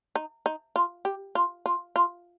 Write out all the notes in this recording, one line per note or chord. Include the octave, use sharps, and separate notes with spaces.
D#4
D#4
F4
G4
F4
F4
F4